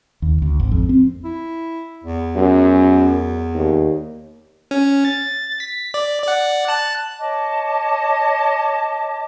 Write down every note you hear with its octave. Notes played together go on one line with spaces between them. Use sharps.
D#2
D2
G#1
F2
C4
E4
E2
F#2
D#2
C#4
A6
B6
D5
D5 F#5
A5 F#6
C#5 D#5 A5 D6